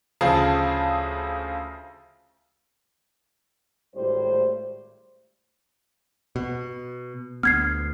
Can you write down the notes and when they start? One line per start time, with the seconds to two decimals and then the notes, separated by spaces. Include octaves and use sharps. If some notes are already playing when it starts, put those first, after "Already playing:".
0.21 D2 C#3 F3 G#4 A5
3.94 G#1 A2 G3 C5
6.36 B2
7.43 D2 B3 F6 G#6 C7